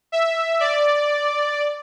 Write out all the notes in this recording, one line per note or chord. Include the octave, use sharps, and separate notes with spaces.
E5
D5